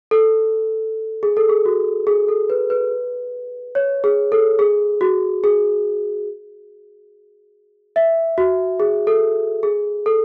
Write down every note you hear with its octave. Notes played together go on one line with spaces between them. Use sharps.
A4
G#4
A4
G#4
F#4
G#4
A4
B4
B4
C#5
G#4
A4
G#4
F#4
G#4
E5
F#4
G#4
A4
G#4
A4